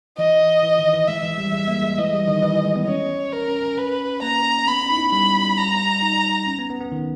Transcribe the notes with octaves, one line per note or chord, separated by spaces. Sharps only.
E3 D#5
E3
D#3
E3
G#3 E5
E3
G3
G#3
A#3
G#3
E3 D#5
G3
D#3
E3
E3
G#3
B3
C#4 C#5
A#4
C#4
C#4
B4
A#3 A#5
B3 B5
C#4
D#4
E4
G3 B5
A#5
D#4
C#4
B3
B3
B3
D#3